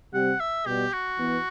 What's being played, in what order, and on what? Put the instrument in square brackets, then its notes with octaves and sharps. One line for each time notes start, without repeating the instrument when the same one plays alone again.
[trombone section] C3 G3 C4 G4 [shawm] F#5
[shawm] E5
[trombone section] B2 G3 B3 [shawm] G4
[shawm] F#4
[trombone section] E3 B3